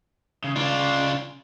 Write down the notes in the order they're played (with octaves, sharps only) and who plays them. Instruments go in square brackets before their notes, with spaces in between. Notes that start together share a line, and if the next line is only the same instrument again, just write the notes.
[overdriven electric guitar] C#3
[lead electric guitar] C#3 F4 [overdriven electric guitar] D4